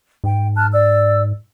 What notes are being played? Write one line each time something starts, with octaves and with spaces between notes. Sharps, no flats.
G#2 G5
A5 F6 F#6
D5 E6